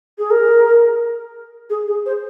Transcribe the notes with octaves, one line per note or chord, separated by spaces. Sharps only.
G#4
A#4
G#4
G#4
C5